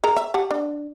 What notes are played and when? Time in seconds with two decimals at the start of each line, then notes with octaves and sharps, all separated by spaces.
0.04 G#4 A#4 A#5
0.16 E5
0.34 G4 F#5 A5
0.51 D4